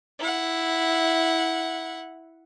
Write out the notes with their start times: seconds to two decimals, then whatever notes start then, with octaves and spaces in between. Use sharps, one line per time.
0.19 E4 F#5